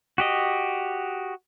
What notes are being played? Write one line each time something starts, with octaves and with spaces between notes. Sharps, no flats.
F#4 G4 D#5